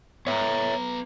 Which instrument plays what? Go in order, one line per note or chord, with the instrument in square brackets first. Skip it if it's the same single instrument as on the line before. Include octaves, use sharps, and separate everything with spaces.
[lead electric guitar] B3 A#5 [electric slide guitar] C#5 E5